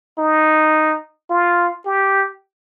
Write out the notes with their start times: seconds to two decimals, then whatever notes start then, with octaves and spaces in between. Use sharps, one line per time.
0.18 D#4
1.30 F4
1.86 G4